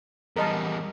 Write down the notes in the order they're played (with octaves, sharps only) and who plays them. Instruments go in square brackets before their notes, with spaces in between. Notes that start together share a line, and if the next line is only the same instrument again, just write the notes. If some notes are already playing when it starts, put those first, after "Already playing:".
[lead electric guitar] E2 G3 [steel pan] A#4 D#5 A5